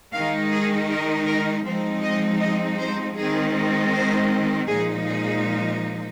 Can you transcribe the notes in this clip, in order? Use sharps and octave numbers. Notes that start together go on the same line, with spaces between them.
D#3 G#3 D#4 F5
G#4
A#4
A#4
F3 G#3 C4 D#4 C5
D#5
D#5
C5
D#3 G#3 C4 D#4 G#4
C5
A#2 F3 G#3 D#4 G#4
G#4